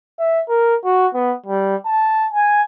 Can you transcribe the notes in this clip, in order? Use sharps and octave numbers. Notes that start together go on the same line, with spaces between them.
E5
A#4
F#4
B3
G3
A5
G#5